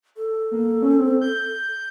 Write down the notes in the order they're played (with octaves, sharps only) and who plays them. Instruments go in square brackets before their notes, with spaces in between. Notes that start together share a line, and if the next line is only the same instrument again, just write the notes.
[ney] A4
[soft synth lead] A#3
C#4
C4
G6